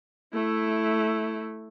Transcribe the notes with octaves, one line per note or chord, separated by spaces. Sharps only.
A3 E4